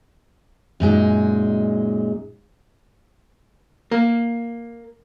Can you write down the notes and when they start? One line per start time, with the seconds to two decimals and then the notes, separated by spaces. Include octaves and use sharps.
0.80 F#2 A#2 G#3 D#4
3.91 A#3